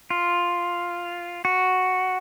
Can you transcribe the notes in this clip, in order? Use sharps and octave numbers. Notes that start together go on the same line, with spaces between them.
F4
F#4